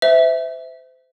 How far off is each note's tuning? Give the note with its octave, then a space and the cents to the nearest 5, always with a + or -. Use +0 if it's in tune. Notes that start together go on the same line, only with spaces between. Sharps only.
C5 -35 E5 -5